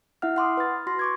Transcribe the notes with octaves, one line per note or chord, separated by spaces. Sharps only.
E4 E5 F#5 F6
F#5 C6 D6 D#6
B4 F6 A6
F#4 C6 A#6
C#6 D6 G#6